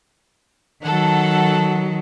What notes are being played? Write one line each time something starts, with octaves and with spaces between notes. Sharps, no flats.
D#3 F#3 A4 F#5